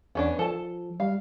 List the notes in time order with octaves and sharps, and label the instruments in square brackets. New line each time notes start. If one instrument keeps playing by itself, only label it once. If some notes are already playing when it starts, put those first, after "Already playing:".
[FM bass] E2 [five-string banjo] B3 C#4 D4
[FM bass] F3 [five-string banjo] A4 A5
[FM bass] G3 [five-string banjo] F5